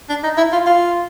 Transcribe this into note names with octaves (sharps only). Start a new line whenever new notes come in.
D4
D#4
E4
F4
F4